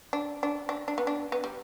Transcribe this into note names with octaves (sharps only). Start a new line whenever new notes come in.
D4
D4
D4
D4
B3
D4
B3
G3